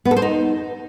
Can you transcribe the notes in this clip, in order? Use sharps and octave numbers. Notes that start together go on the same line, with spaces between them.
B3
A4
C5
D#4